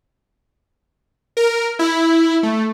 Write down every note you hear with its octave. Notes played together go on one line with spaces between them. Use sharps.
A#4
E4
A3